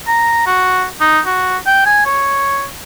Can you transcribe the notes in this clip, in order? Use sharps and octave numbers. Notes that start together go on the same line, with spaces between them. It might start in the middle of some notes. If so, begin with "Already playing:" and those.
A#5
F#4
D#4
F#4
G5
G#5
C#5